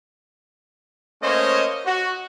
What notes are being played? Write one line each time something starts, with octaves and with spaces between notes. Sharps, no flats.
A3 A#3 C#4 C5 C#5 D#5
F#4